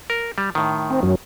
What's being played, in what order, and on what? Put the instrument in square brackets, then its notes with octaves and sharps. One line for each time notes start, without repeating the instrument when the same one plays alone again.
[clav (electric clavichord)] A#4
G3
A2 D#3
[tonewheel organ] C4
F#2 F#3